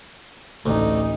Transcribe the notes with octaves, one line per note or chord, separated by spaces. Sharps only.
A1 D2 D#4